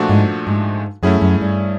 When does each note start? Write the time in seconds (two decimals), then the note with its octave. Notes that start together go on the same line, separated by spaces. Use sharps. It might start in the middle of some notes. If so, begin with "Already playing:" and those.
Already playing: A#2 F3 A3 D4 F#4
0.09 G#2
0.47 G#2
1.03 F#2 A3 C#4 E4 G#4
1.22 F#2
1.41 G2